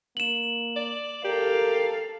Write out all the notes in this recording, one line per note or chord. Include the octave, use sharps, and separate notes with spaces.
A#3 E7 F#7
D5
G4 A4 A#4 F5